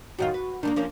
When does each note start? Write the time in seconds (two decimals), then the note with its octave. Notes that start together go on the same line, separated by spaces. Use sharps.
0.18 F#2 D#3 F4 F#4
0.34 B4
0.63 D#3 G#3 A#3 D4
0.76 F3 A#3 C#4